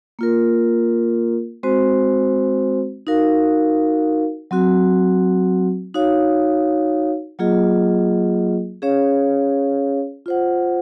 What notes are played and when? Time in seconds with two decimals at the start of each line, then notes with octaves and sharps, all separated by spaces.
0.19 A#3 F4 A#4
1.63 G#3 C4 F#4 C5
3.07 D#4 F#4 A#4 F5
4.51 F#3 C4 F#4
5.94 D#4 F#4 C#5 F5
7.39 F#3 A#3 F4 G#4 D#5
8.82 C#4 G#4 C#5 F5
10.26 F4 C5 F#5